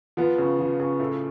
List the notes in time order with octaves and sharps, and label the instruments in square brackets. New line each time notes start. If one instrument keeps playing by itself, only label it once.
[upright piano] F3 B3
C#3
F3
C#3
A2 A3